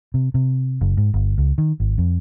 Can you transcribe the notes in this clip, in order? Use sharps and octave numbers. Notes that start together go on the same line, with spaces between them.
C3
C3
F#1
G#2
G1
C#2
D#3
G#1
F2